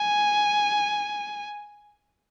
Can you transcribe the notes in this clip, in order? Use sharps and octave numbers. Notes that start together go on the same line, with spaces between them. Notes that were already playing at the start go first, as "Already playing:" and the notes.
Already playing: G#5